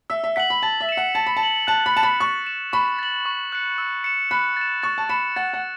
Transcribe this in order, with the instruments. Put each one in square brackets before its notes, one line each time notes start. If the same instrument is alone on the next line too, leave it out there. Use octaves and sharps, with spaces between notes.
[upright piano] E5 [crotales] E6
[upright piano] E5
[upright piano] F#5 [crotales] B6 F#7
[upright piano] B5
[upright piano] A5 [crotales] A6
[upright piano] E5
[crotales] C#7 E7
[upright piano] F#5
[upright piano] A5 [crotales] A6
[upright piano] B5
A5
[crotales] C#7 F#7
[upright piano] A5 [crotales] F#6
[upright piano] B5
[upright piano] A5 [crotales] C#7 E7
[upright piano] B5
[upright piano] C#6 [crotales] A6
[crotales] E7
[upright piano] B5 [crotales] C#6
[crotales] A6 F#7
C#6
F#6 C#7
E6
C#7 E7
[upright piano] B5 [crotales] F#6
[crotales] A6 E7
[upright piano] C#6 [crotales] A6
[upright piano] A5
[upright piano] B5 [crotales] C#7 E7
[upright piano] F#5 [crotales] A6
[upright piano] F#5